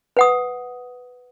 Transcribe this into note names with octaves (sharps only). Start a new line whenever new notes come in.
B4 F#5 D#6